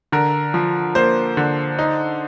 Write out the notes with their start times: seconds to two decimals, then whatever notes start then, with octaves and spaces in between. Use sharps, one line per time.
0.12 D3 A#4
0.54 F3
0.95 A#3 C5
1.37 D3
1.79 D#4